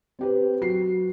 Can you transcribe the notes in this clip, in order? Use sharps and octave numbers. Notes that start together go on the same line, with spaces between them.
C4 G4 B4
F#3 F#4 C7